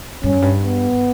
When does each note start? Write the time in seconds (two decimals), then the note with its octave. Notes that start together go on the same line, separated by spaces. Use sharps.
0.23 G2 C#4
0.32 F#2
0.42 G2
0.64 B3